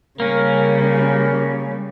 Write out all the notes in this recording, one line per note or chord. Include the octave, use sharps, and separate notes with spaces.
C#3 G3 A#3 C#4 A#4